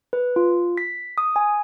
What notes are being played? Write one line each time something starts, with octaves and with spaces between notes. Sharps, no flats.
B4
F4
B6
D#6
G#5